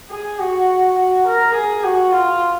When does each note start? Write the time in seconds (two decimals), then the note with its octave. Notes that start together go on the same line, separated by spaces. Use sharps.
0.10 G#4
0.39 F#4
0.98 F#4
1.26 A#4
1.54 G#4
1.84 F#4
2.12 F4